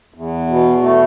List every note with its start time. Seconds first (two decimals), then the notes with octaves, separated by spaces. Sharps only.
0.14 E2
0.48 B2
0.82 A3